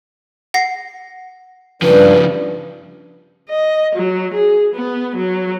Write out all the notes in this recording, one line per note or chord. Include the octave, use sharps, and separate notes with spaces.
F#5 A#6 C7
G2 C#3 F3 B4
D#5
F#3
G#4
B3
F#3